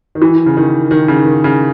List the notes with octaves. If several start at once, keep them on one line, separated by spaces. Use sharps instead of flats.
D#3
E3
C#3
D#3
D#3
C#3
D#3
C#3